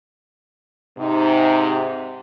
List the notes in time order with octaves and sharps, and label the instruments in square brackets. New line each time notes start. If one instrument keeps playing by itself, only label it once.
[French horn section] G#2 C3 D#4